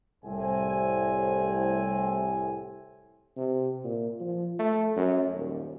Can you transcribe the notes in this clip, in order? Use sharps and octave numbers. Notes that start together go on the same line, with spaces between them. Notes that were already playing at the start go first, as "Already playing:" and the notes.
C2 A2 C4 G#5
C3
A#2
F3
A3
F#2
D#1